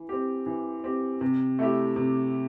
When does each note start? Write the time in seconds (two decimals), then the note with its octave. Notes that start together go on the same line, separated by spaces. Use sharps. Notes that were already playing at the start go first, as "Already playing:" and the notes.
Already playing: E3
0.09 C4 G4
0.46 E3
0.84 C4 G4
1.21 C3
1.59 A3 E4 G4
1.96 C3